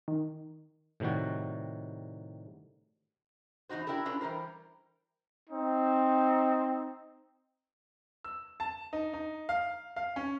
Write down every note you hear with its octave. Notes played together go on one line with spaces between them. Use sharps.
D#3
A2 C3 D#3 G3 F#4
E2 B2 D#4 F#4 C5
D4 E4 G4 A4 A#4
C#4 D4 F4 A4 B4
E3 F3 G3 A#4 C5
C4 D#4
E6
A5
D#4
D#4
F5
F5
C#4